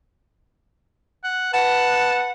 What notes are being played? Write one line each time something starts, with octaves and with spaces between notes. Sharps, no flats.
F#5
B4 F#5 A5